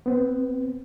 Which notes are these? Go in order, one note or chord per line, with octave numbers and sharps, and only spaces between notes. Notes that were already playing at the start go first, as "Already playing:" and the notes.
B3 C4